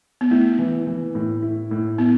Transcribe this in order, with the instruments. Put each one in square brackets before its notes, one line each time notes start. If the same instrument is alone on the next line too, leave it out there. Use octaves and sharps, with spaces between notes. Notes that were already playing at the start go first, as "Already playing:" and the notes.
[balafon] B3
[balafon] A3 [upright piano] E4
[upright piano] E3
E3
A2
E4
A2
[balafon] B3 [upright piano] E4